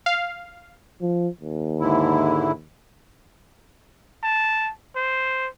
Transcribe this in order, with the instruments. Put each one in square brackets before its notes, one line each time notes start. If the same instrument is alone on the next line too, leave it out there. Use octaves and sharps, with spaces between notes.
[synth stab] F5
[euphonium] F3
D#2
[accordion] G#2 D3 E4
[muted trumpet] A5
C5